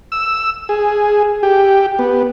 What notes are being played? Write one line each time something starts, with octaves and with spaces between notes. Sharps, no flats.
E6
G#4
G4
B3